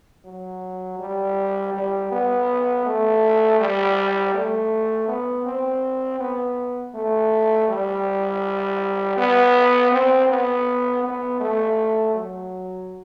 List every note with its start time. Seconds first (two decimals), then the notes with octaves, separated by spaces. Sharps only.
0.25 F#3
0.99 G3
1.73 G3
2.12 B3
2.86 A3
3.60 G3
4.34 A3
5.08 B3
5.46 C4
6.20 B3
6.95 A3
7.69 G3
9.17 B3
9.92 C4
10.29 B3
11.04 B3
11.40 A3
12.15 F#3